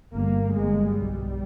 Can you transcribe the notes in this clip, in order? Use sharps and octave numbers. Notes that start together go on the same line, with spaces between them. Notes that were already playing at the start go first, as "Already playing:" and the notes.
G1 G2 A#3
G1 G2 G#3
B1 B2 G3